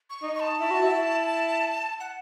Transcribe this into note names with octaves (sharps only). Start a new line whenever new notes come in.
C#6
D#4
C#6
A5
E4
F#4
E4
F#5